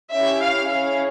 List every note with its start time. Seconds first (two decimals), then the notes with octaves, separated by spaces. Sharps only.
0.12 C#4 E4 G4 E5
0.41 F5
0.69 C#4 E4 G#4 F5